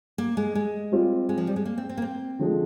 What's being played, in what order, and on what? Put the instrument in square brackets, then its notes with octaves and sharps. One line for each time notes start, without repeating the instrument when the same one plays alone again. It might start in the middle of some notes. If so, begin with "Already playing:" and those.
[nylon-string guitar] A#3
G#3
G#3
[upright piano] G3 C4 F4
[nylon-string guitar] G#3
F3
G3
G#3
A#3
C4
C4
A#3
C4
[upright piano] D3 F3 G#3